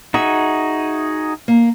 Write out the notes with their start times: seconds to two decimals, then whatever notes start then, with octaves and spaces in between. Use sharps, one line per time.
0.14 D#4 F#4 G#4 E5
1.48 A#3